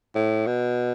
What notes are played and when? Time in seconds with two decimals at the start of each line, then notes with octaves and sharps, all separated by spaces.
0.15 A2
0.47 B2